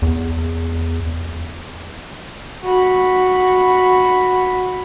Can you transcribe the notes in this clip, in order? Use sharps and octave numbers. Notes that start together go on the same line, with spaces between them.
E2
F#4 B5